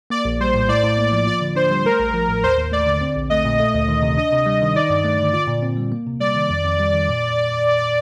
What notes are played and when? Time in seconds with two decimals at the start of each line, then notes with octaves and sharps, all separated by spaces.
0.10 A#3 D5
0.25 A#1
0.41 G3 C5
0.54 A2
0.69 A2 D5
0.83 A2
0.98 A#3
1.12 F3
1.27 F4 D5
1.41 D3
1.56 D4 C5
1.71 G3
1.85 A3 A#4
2.00 A1
2.14 F3
2.29 A2
2.44 D#2 C5
2.58 D#2
2.72 A3 D5
2.87 D3
3.01 C4
3.16 A#1
3.30 A3 D#5
3.45 A#2
3.59 A3 D#5
3.74 D2
3.88 D#3
4.03 C3
4.18 D4 D#5
4.32 C3
4.46 G3
4.62 D#3
4.76 D#4 D5
4.90 G2
5.04 A3
5.19 D3
5.33 F4 D5
5.48 A#2
5.63 C4
5.77 G3
5.92 A#3
6.07 C3
6.20 G3 D5
6.35 D#3
6.50 F2
6.65 F2
6.80 G3
6.94 D#3
7.09 A#2